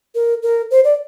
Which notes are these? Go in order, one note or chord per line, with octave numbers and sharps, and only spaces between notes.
A#4
A#4
C5
D5